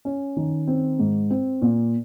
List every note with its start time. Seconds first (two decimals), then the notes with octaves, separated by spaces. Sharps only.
0.05 C#4
0.37 D#3
0.68 C4
0.99 G#2
1.30 C4
1.62 A#2